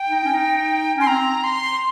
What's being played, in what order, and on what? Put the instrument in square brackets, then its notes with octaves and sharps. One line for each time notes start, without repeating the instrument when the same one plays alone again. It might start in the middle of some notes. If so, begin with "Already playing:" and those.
Already playing: [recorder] G5
[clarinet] D#4
C#4
D#4
[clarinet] C#4 [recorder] C6
[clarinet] C4 [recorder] A#5
[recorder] C6